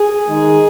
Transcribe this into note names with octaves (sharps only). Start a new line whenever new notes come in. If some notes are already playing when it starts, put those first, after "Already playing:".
Already playing: G#4
D#3 G#3 D#4